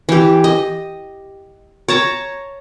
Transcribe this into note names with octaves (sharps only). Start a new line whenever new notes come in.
E3 G4
D#5
C#5 A5 A#5